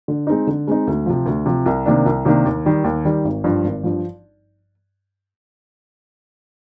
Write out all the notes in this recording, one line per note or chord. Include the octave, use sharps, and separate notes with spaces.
D3
G#3 C4 D#4
D3
G#3 C4 D#4
D2
C3 F3
D2
C3 F3
C2
C3 D#3 A#3 D4
C2
C3 D#3 A#3 D4
D#2
D#3 G3
D#2
D#3 G3
G#1
G2 F3
G#1
G2 F3